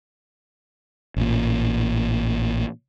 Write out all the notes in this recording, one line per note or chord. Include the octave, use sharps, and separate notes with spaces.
A1 A#2